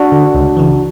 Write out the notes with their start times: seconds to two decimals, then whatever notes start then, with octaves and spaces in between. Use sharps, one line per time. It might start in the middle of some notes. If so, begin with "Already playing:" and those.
Already playing: D4 F#4
0.12 D3
0.35 C#2
0.57 C#3 E3